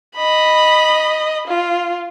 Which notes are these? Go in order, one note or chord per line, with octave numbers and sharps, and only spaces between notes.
D#5 B5
F4